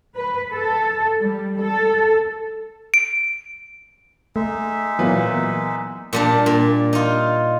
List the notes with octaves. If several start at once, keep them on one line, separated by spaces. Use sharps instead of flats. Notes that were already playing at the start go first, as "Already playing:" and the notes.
B4
A4
G3
A4
D7
G#3 A3 D#4 E5
A#2 E3 F#3 A#3 B3
A#2 G3 D4
A#2
D#4 F4